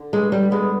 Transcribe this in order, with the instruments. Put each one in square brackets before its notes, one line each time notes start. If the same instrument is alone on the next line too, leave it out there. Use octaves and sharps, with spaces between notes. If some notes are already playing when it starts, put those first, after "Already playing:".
Already playing: [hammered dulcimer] D3
[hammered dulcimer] G2 [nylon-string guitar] G#3
[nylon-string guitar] G3
[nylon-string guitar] G#3 [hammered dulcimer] B3